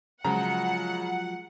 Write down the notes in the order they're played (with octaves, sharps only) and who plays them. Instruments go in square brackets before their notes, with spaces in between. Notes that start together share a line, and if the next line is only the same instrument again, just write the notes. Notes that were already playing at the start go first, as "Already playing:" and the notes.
[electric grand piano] C#3 A#5 [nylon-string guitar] F3 F#3 G#3 [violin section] F#5